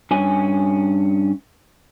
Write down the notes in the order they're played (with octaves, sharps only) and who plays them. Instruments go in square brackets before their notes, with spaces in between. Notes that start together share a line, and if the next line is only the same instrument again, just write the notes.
[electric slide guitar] G2 C#4 G#5